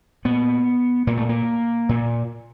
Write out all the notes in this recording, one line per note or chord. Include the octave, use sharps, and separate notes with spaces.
A#2 B3
A#2 A#3
A3
A#3
A#2